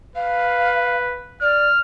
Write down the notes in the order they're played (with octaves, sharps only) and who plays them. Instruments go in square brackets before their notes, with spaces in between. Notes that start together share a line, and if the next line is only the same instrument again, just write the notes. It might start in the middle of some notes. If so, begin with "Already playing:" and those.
[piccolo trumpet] B4 [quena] F5
[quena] D5 [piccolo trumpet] F6